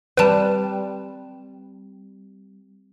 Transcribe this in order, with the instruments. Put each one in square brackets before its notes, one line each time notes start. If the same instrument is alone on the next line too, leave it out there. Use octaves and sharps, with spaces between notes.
[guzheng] G3 C4 [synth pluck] B4 A5